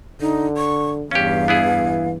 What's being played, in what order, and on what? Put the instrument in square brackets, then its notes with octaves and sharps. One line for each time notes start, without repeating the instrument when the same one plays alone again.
[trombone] D3 [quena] D#4
[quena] C#6
[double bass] E2 G2 [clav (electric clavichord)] C#4 G4 [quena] F5
[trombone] E3 [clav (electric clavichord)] B3 E4 G#4